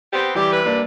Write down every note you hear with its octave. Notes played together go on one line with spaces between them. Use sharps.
B3 C4 G4
E3 G3 G4
C3 B4
G3 A#3 D4